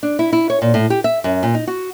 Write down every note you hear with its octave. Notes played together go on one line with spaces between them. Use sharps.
D4
E4
E4
C#5
A#2
A2
G4
E5
F#2
A#2
D#4
F#4